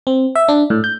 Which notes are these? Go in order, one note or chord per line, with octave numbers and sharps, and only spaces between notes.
C4
E5
D4
A2
G6